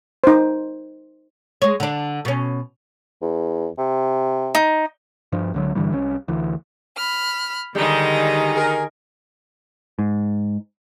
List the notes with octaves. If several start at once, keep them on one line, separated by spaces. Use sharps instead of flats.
D#4 C5
G#3 C#5
D3 D4
B2 C#4
E2
C3
D#4
G2 F3
C#2 D3 F#3
G2 D3 E3 G3
C2 C#4
D2 E3
B5 F6
D3 D#3 G3 G#3 D#4
G#4 A#4
G#2